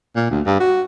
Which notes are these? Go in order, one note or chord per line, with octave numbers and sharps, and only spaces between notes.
A#2
D2
G2
F#4